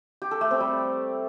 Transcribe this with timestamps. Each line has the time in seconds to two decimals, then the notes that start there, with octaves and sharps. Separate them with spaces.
0.22 G4
0.31 A4
0.41 A3
0.51 C4
0.60 G3